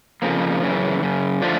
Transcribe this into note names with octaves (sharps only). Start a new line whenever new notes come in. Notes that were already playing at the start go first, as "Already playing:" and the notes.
F2 C#3 F3 A#3
F#2 C#3 E3
F#2 C#3
D3 F3 A3 D4 F4